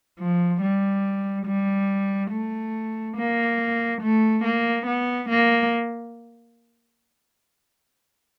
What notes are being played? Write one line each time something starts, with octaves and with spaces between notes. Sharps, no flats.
F3
G3
G3
A3
A#3
A3
A#3
B3
A#3